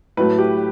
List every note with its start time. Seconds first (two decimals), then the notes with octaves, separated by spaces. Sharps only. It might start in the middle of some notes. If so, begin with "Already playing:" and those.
0.17 A2 F#3 A3 B4
0.38 G4